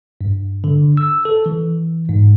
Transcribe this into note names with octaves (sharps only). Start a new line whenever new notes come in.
G2
D3
E6
A4
E3
G#2